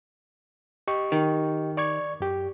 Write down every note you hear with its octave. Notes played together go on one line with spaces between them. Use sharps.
G4 D#5 C#6
D#3
D5 C#6 G#6
F#2 G4